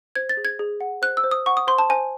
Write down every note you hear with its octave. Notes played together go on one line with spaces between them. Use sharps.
C5 G#6
A6
G#4
G#6
G#4
F#5
C5 F#6
E6
C5
D#6
F#5 C#6
D#6
C5 C6
A5
C5 G#5